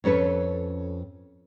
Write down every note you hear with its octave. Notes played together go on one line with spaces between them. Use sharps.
F2 C#4 A4 B4 C#5